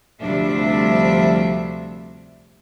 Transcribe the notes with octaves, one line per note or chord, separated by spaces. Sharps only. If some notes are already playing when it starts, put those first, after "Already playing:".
D2 C3 F3 G3 D4 E5